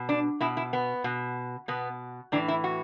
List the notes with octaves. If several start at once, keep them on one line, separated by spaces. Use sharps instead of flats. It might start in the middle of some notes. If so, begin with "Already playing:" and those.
Already playing: B2
D4
B2 E4
E4
B3
B2
B2 B3
A2 E3 D4
E4
F#4